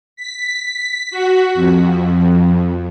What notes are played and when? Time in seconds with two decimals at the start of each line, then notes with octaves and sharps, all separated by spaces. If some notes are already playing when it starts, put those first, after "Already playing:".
0.16 B6
1.11 F#4
1.55 F2